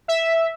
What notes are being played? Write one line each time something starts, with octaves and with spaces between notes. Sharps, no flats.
E5